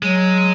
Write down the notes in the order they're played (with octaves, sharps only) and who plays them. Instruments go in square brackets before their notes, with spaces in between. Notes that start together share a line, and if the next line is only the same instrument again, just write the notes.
[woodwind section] F#3 [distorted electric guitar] G#3